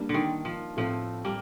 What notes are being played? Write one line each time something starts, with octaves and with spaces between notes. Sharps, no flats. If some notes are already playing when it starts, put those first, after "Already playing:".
Already playing: G3 A#3 D4
D3
D#3
F3
A2 F3 A3 C4
G3 A#3